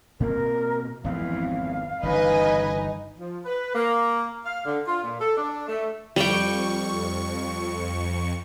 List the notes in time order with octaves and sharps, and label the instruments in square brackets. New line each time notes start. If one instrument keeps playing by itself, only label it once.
[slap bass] B2 A#3 C4 [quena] A#4
[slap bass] G#1 B3 C4 [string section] F2 E3 [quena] F5
[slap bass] G1 C#3 E3 [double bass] D#4 [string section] B4 D#5 G#5
[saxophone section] F3
B4
A#3
F5
D3
F4
A#2
A4
D4
A3
[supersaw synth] F2 C#6 [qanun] G3 G5